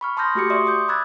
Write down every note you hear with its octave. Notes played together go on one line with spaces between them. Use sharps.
B5 C#6 F6
A5 C6 D#6 F6 G6 A#6
A3 F#4 G4 D6 C#7
D5 E5 C6 C#6 D#6
D6 D#6 G6
B5 D6 E6 F#6 G#6 A6